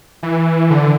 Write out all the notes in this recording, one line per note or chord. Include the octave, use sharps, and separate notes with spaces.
E3
D3